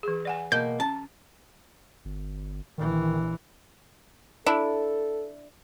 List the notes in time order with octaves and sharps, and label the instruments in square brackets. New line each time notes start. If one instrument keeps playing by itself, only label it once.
[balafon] E3 G#4
D5 F#5 G#5
[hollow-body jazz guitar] B2 A#3 [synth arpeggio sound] G6
[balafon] C#4 [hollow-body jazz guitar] A5
[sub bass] G1
[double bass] A#1 E3 [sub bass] D#3
[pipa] D4 E4 [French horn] A4